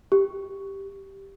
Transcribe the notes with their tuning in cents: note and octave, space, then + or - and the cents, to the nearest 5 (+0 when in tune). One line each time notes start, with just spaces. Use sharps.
G4 +0